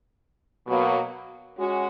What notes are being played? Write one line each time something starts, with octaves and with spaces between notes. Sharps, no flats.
B2 F#3 A#3
G#3 C#4 F#4